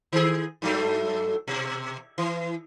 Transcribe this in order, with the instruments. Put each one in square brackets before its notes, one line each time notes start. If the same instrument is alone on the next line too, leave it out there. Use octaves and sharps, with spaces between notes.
[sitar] D#3 G#4
G2 F#3 A3
B2
E3